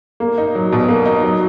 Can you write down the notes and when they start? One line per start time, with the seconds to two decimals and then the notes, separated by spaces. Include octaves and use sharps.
0.20 A#3
0.38 D#4
0.55 F#3
0.72 B2
0.88 A#3
1.06 D#4
1.23 F#3